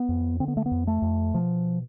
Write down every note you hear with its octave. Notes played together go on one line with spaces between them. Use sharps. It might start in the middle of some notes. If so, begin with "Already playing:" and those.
Already playing: B3
F2
D3 C4
B3
A3
B3
F2
A3
F2
B2 F3